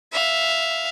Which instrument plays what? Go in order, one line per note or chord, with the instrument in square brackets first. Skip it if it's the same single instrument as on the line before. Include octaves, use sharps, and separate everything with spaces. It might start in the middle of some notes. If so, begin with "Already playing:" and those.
[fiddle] E5 F5